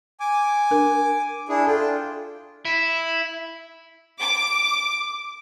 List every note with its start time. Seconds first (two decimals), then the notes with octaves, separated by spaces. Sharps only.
0.20 G#5 D6
0.71 D4 A#4
1.49 D4 E4 G#4
1.67 D4 F4 A4 G5
2.65 E4
4.19 D6